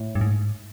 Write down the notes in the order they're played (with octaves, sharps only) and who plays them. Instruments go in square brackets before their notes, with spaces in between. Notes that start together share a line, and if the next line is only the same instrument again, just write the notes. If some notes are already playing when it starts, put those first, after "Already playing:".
Already playing: [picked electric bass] A2
[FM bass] G2
G#2